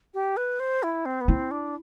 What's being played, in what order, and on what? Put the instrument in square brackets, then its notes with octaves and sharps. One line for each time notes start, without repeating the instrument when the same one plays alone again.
[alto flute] G4
B4
C5
E4
C4
B3
[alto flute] C4 [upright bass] E4
[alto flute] D4